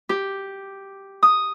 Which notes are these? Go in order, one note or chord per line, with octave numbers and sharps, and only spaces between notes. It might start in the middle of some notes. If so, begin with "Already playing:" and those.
G4
D#6